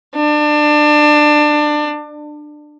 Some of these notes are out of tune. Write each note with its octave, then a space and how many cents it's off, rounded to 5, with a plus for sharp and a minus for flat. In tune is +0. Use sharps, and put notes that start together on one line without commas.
D4 +25